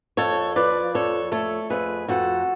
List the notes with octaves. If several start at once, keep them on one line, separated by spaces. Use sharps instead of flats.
F2 A4 C#5
F3 B4 D5
F2 A4 C#5
A3 A4 C#5
F2 G#4 B4
F2 F#4 A4